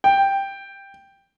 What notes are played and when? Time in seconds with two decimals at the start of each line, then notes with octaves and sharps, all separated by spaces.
0.04 G5